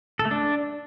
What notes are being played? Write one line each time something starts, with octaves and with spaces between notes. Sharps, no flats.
A4
A3
D4